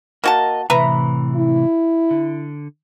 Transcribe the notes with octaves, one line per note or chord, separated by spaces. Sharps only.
A#3 F#4 A#4 D#5 A5
A2 C3 E3 B4 E5 A#5
E4
D3